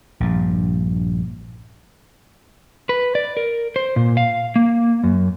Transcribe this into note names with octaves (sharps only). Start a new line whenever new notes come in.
A#1 G2
B4
D5
A#4
C5
A#2
F5
A#3
F#2